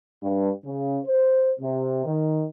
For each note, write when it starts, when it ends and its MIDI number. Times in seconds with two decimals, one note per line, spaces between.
0.23 0.50 43
0.65 0.98 49
1.05 1.51 72
1.60 2.03 48
2.05 2.43 51